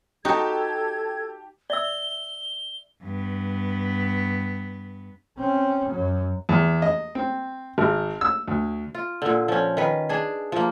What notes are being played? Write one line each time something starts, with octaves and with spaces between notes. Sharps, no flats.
D#4 F#4 G4 A4 A5 G#6
D5 E5 E6 G7
G2 B3
C4 C#4
F#2 F#3
E2
D#5
C4
G#1
E6
D2
F4
A#2 D3
F3 C#4
D#3 B4
D4 G#4
F3 A#3